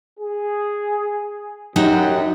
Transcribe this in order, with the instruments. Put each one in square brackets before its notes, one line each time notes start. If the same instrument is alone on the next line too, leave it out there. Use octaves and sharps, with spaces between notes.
[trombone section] G#4
[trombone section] F#2 [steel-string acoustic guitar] D#4 F#4 G4